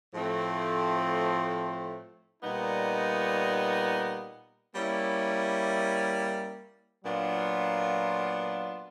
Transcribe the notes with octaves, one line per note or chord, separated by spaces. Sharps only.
A2 F3 A3 C4
A#2 G3 B3 D#4
G3 A#3 C#4 E4
A#2 F#3 B3 D4 F4